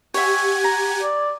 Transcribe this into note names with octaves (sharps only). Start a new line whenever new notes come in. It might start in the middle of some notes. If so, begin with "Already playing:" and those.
G4 C#5 E5 F#5 G#5 G#6
A#5
D5